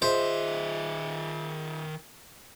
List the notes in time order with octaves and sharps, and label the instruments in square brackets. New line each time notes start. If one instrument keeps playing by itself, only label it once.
[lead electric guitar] D#3 E5 [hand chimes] F4 G#4 D#5 [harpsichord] C5